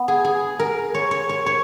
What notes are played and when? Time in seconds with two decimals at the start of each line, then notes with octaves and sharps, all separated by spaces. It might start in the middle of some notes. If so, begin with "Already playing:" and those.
Already playing: B3
0.08 G#4
0.25 G#4
0.59 A#4
0.94 C#5
1.11 C#5
1.29 C#5
1.46 C#5